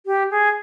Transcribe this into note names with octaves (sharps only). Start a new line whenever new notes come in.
G4
G#4